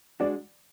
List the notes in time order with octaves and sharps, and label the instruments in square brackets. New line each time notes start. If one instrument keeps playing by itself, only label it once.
[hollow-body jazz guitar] G#3 D4 F#4 [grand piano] D5